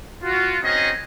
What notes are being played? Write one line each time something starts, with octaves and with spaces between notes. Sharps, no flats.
F4 F#4
C4 C#4 D#4 F#4 G#4 D#5